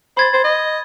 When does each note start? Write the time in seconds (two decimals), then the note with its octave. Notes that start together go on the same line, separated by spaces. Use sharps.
0.17 C5 B5 G#6 A6
0.33 C5
0.44 D#5